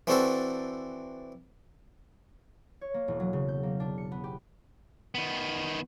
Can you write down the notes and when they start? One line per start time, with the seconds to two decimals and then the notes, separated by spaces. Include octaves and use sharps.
0.07 E3 C4 D4 F#4 A4 C5
2.81 C#5
2.94 A#3
3.08 E1
3.20 F#3
3.33 C#3
3.48 G6
3.63 A#3
3.80 D4
3.98 C#7
4.12 B3
4.24 G4
5.15 D#3 B3